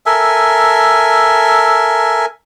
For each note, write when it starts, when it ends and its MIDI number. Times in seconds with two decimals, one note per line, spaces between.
0.06 2.26 69
0.06 2.26 70
0.06 2.26 76
0.06 2.26 80